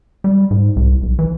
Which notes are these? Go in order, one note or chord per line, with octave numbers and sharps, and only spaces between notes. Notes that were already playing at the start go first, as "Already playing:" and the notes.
G3
G#2
C2
B1
E3